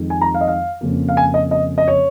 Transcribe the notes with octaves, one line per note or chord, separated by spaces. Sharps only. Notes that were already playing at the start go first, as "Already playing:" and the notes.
Already playing: F2 D#3 G#3
G#5
A#5
F5
D#5
F5
F2 C#3 A#3
F5
G#5
D#5
D#5
D#5
C#5